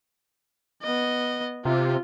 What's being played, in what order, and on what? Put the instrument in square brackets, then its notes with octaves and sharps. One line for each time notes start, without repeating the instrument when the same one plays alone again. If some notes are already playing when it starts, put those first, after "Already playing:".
[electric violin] B3 D#5
[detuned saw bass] C3 [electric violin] F4